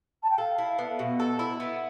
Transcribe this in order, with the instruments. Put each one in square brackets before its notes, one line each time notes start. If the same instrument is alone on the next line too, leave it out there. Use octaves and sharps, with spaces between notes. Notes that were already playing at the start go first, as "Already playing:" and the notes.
[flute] A5
G5
[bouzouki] A4 [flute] F5
[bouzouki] E4
B3
B2
A4
E4
B3